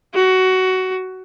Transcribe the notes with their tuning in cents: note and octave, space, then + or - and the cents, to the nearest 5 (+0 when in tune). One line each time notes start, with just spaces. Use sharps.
F#4 +15